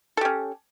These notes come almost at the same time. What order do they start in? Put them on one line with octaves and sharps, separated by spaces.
A4 G4 C#4